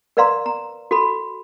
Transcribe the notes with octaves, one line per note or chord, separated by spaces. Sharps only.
A#4 B4 D5 F5 A#5 C6
A#5
F#4 A4 B5